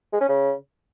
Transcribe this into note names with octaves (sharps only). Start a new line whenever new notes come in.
G#3
C#4
C#3